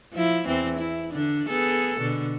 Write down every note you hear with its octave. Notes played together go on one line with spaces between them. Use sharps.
F3 E4
E2 E3 C4
E4
D3 D4
B3 G#4 A4
B2 D3